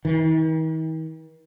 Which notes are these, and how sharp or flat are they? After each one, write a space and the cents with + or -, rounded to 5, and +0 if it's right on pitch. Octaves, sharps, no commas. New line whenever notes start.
D#3 +45